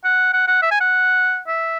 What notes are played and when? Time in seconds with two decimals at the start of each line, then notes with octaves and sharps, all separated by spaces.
0.04 F#5
0.33 F#5
0.48 F#5
0.62 E5
0.71 G#5
0.80 F#5
1.48 E5